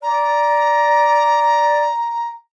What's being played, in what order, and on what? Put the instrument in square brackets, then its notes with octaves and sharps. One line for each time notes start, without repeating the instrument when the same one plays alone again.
[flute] D5 [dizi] A#5